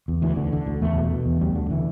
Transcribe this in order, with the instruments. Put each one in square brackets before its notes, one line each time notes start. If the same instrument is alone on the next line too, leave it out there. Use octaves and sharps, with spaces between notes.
[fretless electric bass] E2
D2 E3
D3
D3
D2
E2 A3
B2
B2
E2
D2 G3
D3
D3 E3